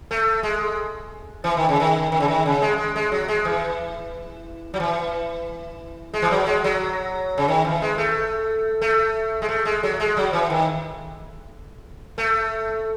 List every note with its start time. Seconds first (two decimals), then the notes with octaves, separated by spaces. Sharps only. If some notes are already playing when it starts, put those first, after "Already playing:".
0.11 A3
0.43 G#3
1.44 E3
1.57 D#3
1.69 C#3
1.80 D#3
2.12 D#3
2.20 C#3
2.28 D#3
2.46 C#3
2.62 G#3
2.78 G#3
2.96 G#3
3.12 F#3
3.28 G#3
3.45 E3
4.74 F#3
4.80 E3
6.14 G#3
6.22 E3
6.31 F#3
6.47 G#3
6.64 F#3
7.38 C#3
7.48 D#3
7.65 E3
7.82 G#3
7.98 A3
8.81 A3
9.42 G#3
9.49 A3
9.65 G#3
9.83 F#3
10.00 G#3
10.17 F#3
10.33 E3
10.50 D#3
12.18 A3